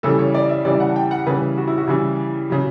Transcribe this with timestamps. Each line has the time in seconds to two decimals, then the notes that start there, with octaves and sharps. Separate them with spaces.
0.03 C#3 E3 G3 A4
0.19 C#5
0.35 D5
0.49 E5
0.65 C#3 E3 G3 D5
0.80 F#5
0.90 A5
0.96 G5
1.11 F#5
1.27 C#3 E3 G3 B4
1.58 F#4
1.68 E4
1.77 F#4
1.88 C#3 E3 G3 E4
2.50 C#3 F#3